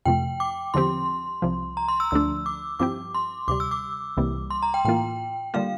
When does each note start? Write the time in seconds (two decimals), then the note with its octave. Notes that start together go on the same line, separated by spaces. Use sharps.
0.05 F2 C3 F3 A3 G5
0.40 D6
0.74 E2 D3 F3 C4 G4 C6
1.42 C2 C3 F3
1.77 A#5
1.88 C6
2.00 E6
2.11 D2 D3 F3 A3 D4 E6
2.46 D6
2.79 G2 F3 C4 E4 G4 D6
3.14 C6
3.48 D2 C3 G3 D6
3.60 E6
3.71 D6
4.17 C2 C3 E3 G3 A#3
4.50 C6
4.62 A#5
4.74 G5
4.85 A2 E3 A#3 F4 G5
5.54 D3 G3 A#3 F4 F5